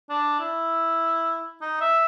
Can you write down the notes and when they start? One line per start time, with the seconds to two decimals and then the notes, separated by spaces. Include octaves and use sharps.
0.09 D4
0.39 E4
1.61 D#4
1.80 E5